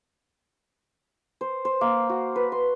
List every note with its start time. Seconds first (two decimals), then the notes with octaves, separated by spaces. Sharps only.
1.41 C5
1.65 C5
1.81 A#3
2.09 F#4
2.36 B4
2.52 C6